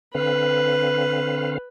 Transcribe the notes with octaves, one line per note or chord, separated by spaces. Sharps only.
D3 C4 B4 F5